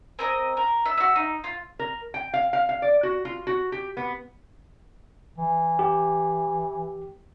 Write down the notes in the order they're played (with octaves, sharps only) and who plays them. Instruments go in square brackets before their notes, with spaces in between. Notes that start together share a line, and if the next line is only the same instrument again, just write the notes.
[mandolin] C4 A#4 D#5
A#4
E5
F#4 E5
D#4
F4
[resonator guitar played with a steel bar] A#4
G5
F5
F5
F5
D5
F#4
F4
F#4
G4
B3
[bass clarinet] E3
[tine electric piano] G4